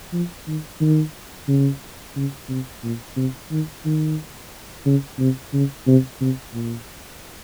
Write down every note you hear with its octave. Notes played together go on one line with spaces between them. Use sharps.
F3
D#3
D#3
C#3
C#3
C3
A#2
C3
D#3
D#3
C#3
C3
C#3
C3
C3
A#2